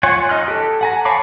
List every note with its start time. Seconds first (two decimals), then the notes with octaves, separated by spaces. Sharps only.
0.03 F4 C#5 F#5 G#5
0.29 D#4 D#5 F6 F#6
0.48 G4 A4
0.81 F#5 G#5 A#5
1.05 C#5 F5 A5 B5 D6